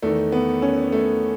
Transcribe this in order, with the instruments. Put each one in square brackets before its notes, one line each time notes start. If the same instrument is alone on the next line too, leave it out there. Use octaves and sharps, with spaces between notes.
[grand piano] E2 D#3 A3
B3
C#4
A3